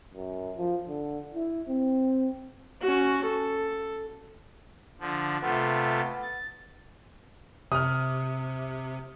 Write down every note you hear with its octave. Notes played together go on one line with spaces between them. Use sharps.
F#2
F3
D3
E4
C4
C#4 F#4
A4
D3 F3
C3 A3 B3 F4
A6
C3 D#6 F6